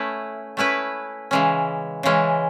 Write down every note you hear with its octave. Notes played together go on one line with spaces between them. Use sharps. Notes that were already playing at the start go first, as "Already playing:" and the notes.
Already playing: A3 C#4 E4 B4
A3 C#4 E4 B4
C#3 E3 G#3 C#4
C#3 E3 G#3 C#4